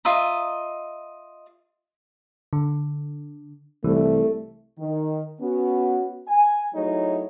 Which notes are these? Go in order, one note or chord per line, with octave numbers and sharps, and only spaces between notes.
F4 D#5 E5 A#5
D3
C2 E3 A3
D#3
B3 C#4 F#4
G#5
F#3 A3 D#4 E4 G#4 C#5